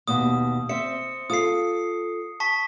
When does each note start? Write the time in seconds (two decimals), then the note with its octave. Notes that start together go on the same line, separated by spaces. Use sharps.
0.08 D#2 B2 D#6
0.69 C4 E5 C#7
1.30 F4 A4 D#6 C7
2.40 A5 C#6 B6